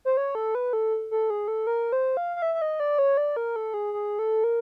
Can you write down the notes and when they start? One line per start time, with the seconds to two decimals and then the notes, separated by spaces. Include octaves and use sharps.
0.05 C5
0.17 C#5
0.35 A4
0.55 B4
0.73 A4
1.11 A4
1.30 G#4
1.48 A4
1.67 A#4
1.92 C5
2.17 F5
2.36 F5
2.42 E5
2.54 E5
2.62 D#5
2.80 D5
2.98 C#5
3.17 D5
3.37 A#4
3.56 A4
3.74 G#4
3.93 G#4
4.19 A4
4.44 A#4